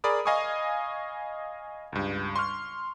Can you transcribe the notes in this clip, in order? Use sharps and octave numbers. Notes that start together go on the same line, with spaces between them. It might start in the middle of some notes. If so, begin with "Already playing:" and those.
G#4 A#4 D5 B5 D#6
D#5 F5 G#5 B5 C#6 D#6
C#2 G2
C6 C#6 F6